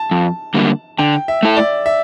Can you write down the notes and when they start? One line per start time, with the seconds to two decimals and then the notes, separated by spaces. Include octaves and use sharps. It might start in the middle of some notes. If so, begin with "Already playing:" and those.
Already playing: A5
0.11 F2
0.54 D3 G3 A#3
0.98 D3 G5
1.28 E5
1.43 A3 E4 A4
1.57 D5
1.86 E5